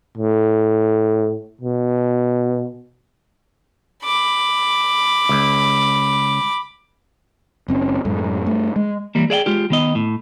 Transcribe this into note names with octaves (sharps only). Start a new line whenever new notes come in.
A2
B2
B5 D6
C#2
F#1 C4 C#4
F#2 A2 G#3 A3
G2 A3
G#3
E3 G3 A#3
G#4 D5 E5 G5
G#3 F4 G4
D#3 B3 D#5
A2